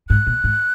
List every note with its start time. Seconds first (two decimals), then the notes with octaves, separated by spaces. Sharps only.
0.09 G#2 F#6
0.27 A#2
0.44 G#2